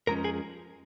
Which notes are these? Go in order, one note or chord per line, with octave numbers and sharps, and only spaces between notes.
F2 F3 G#3 C#4 A#4 A#5
G#4 G#5